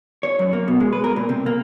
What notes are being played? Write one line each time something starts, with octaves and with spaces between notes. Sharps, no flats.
C#5
F#2
A#3
B2
G#3
B4
A#4
A#2
C3
A#3